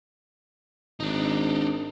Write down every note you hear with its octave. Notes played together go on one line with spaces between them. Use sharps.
G#1 D4 D#4